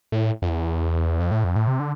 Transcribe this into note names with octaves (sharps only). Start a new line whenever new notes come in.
A2
F2
E2
F2
A2
F2
A2
C3
D3